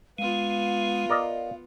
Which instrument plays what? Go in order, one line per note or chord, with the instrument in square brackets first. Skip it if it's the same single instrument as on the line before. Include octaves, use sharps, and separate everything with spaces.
[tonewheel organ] G#3 [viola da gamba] B3 F4 [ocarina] F5
[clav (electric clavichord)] A#4 D5 D#5